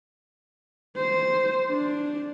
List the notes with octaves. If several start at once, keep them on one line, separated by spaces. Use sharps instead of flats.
C5
D4